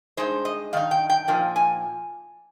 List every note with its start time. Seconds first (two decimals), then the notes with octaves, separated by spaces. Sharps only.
0.17 G2 D#3 G#3 D#4 C5
0.45 D#5
0.73 G2 D#3 D#4 F5
0.91 G5
1.10 G5
1.28 A#2 F3 A#3 D#4
1.56 G#5